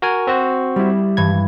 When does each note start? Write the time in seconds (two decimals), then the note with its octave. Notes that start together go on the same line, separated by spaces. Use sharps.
0.02 F#4 A#4 G#5
0.27 C4 F#4 C5
0.76 G3 E4
1.17 G2 E3 G#6